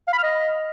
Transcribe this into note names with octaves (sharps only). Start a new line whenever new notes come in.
F5
B5
F6
D#5